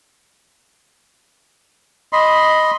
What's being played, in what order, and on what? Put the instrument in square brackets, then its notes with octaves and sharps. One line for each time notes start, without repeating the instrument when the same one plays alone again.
[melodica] D#5 B5 C6